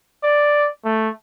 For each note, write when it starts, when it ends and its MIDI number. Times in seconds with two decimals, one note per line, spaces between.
0.24 0.69 74
0.85 1.09 57